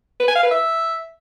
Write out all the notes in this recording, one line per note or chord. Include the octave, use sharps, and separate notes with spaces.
B4
G#5
F5
B4
E5